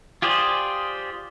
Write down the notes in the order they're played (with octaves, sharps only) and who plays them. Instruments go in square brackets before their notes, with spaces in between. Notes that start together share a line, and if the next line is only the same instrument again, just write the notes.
[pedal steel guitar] F4 G4 G#4 C5 D5